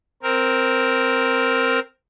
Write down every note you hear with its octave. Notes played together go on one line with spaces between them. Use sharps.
C4 A#4